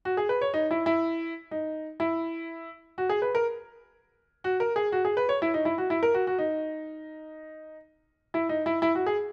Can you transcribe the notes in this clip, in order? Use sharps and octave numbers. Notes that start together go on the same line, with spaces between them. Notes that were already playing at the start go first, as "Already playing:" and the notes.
F#4
G#4
B4
C#5
D#4
E4
E4
D#4
E4
F#4
G#4
B4
A#4
F#4
A#4
G#4
F#4
G#4
B4
C#5
E4
D#4
E4
F#4
E4
A#4
F#4
F#4
D#4
E4
D#4
E4
E4
F#4
G#4